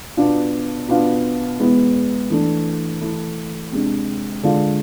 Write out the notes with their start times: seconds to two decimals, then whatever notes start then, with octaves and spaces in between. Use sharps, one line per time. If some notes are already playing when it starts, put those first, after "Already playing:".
0.17 B2 B3 D4 F4
0.88 B2 B3 D4 F4
1.59 E2 B2 G#3 B3 E4
2.30 E3 A3 D4
3.01 E3 A3 E4
3.72 C3 G#3 D4
4.43 D3 G#3 D4 F4